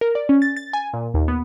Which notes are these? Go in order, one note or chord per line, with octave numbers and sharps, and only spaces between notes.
A#4
D5
C#4
A6
A6
G#5
A#2
D#2
B3